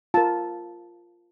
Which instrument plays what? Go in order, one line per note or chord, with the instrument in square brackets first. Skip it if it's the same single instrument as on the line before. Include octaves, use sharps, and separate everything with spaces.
[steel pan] F4 A#4 A5